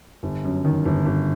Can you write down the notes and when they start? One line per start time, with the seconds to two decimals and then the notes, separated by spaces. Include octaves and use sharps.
0.23 G1
0.44 F#2
0.65 D#3
0.86 G1
1.06 G1